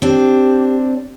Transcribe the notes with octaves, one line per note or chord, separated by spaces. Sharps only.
C4 D4 G4